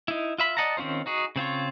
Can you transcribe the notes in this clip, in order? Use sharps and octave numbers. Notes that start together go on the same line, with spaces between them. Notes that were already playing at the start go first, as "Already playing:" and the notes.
D#4 E4
F4 E5 B5
D5 D#5 F#5 A5 A#5
D#3 C4 C#4 F4 C5
D#4 F#4 G#4
C#3 C4 F4 C#5